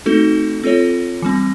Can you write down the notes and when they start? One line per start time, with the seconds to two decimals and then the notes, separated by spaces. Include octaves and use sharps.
0.06 A3 C4 D#4 F#4 A4
0.63 C4 F4 A4 C#5
1.22 E3 G3 C4